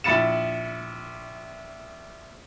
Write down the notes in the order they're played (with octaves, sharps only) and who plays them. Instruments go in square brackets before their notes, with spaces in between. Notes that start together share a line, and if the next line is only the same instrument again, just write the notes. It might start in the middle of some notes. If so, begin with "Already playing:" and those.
[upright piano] A#1 E4 B5 A6 C#7 E7